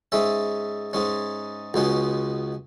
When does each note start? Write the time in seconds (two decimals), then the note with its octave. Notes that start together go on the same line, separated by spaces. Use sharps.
0.12 G#2 G#3 C#4 E5
0.93 G#2 G#3 C#4
1.74 C#2 B2 G#3 C#4